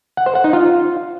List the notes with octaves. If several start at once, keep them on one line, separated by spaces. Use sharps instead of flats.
F#5
C5
F#5
D#4
F4